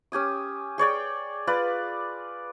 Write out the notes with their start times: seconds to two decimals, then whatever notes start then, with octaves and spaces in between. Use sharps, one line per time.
0.12 C#4 G4 G#5 D#6
0.78 G#4 C#5 D5 G5
1.47 F4 B4 D5